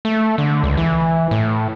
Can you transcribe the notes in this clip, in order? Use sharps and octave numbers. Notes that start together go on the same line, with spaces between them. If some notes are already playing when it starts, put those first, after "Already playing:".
A3
D3
C#2
E3
A2